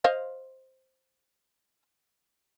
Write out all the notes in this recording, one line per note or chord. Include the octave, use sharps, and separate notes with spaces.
C5 D#5 F5